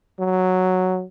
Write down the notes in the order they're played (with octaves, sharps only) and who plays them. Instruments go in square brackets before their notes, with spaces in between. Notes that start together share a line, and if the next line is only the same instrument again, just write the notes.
[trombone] F#3